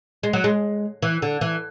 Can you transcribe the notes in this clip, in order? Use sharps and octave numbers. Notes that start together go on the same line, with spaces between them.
G#3
F#3
G#3
E3
D3
E3